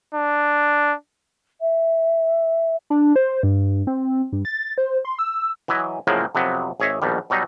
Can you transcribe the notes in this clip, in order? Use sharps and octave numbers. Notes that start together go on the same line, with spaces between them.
D4
E5
D4
C5
G2
C4
G2
A6
C5
C6
E6
E3 F#3 E4 D#5 G#5
A2 C#3 F3 F#3 G#3 A#3
F2 C3 F#3 B3
G#1 G#4 C#5 D#5 E5
A#1 B2 D#3 G3
B2 F#3 G3 D#4